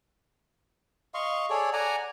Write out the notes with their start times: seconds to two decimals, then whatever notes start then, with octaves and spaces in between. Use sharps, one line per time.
1.14 D#5 F5 C6 C#6
1.50 G#4 A4 C#5 D5
1.73 D5 F#5 G#5 A#5